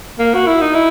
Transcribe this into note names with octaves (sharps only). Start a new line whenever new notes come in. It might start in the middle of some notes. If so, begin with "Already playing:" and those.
A#3
F#4
E4
D#4
E4